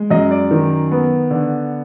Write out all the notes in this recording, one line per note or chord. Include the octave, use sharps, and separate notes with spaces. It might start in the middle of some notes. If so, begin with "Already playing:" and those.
Already playing: G#3
F#2 D#5
D5
D#3
B3
D3